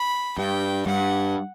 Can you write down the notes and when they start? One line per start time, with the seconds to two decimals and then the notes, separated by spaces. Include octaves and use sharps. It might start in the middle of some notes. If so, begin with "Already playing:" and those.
Already playing: B5
0.38 G2 G5
0.86 G2 F#5